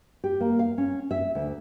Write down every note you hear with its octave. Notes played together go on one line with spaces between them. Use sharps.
G4
A#3
F5
C#4
E5
D2